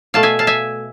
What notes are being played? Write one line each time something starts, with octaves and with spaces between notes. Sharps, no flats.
B2 A3 F5 A5
E5 G#5
F5 A5
E5 G#5